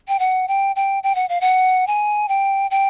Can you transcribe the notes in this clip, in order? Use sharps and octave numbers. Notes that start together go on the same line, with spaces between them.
G5
F#5
G5
G5
G5
F#5
F5
F#5
G#5
G5
G5